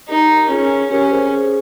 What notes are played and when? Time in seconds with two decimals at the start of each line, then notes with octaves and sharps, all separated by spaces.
0.09 D#4 G4 A#4
0.43 A#4
0.50 C#4 F4 G#4
0.90 C#4 G4 A#4
1.10 G#4 C5